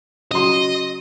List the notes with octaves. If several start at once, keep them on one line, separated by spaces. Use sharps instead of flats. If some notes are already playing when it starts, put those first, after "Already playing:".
C#3 F#3 D#5 C6